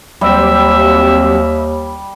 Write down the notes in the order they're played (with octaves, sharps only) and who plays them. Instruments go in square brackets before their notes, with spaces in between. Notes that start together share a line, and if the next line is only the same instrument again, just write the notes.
[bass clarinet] D#2 [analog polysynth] F#3 C4 G4 [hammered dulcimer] G3 [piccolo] E5